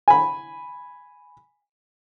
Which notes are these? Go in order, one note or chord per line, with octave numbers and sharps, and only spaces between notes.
G#5 B5